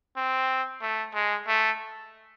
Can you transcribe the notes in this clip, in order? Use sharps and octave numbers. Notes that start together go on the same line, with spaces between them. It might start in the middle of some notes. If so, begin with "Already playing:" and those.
C4
A3
G#3
A3